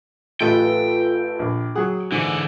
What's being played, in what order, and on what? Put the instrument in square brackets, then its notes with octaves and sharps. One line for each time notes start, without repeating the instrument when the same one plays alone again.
[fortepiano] A1 A3 D#5 [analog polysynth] F4 A4 B4 [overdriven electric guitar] G5
[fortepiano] A#1
[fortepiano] F#3 F#5 [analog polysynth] G#4
[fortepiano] G#2 [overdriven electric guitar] D3 E3